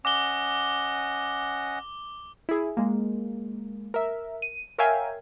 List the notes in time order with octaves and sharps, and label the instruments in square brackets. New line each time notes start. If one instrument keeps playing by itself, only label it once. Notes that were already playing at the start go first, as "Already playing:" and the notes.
[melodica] C#4 D#5 F#5 [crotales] D6 G7
[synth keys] E4 G#4
G#3 A#3
A#4 E5
D#7
A#4 C#5 E5 F5 G5 G#5